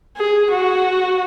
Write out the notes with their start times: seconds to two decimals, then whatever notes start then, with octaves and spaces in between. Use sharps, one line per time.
0.17 G#4
0.52 F#4